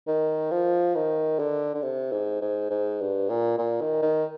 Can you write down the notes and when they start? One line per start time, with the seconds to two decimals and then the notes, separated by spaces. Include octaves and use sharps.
0.08 D#3
0.51 F3
0.95 D#3
1.39 D3
1.75 D3
1.82 C3
2.12 G#2
2.42 G#2
2.70 G#2
3.01 G2
3.29 A#2
3.58 A#2
3.81 D#3
4.02 D#3